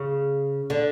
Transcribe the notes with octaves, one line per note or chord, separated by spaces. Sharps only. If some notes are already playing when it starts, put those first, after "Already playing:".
Already playing: C#3
D3